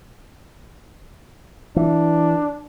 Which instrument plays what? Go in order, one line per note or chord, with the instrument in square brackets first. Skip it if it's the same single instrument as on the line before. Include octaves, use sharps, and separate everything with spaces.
[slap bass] E3 [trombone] D4